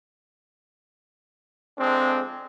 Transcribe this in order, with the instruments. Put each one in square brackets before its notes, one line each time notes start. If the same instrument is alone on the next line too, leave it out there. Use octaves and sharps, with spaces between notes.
[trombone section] F2 G#3 D4 [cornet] C4